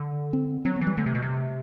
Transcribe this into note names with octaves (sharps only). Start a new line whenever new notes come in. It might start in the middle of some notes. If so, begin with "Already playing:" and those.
Already playing: D3
C4
F#3 C4
B3
E3
G3
D3 A3
C3
B2
C3